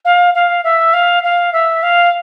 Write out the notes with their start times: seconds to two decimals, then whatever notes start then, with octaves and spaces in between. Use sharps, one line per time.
0.04 F5
0.34 F5
0.63 E5
0.93 F5
1.23 F5
1.52 E5
1.82 F5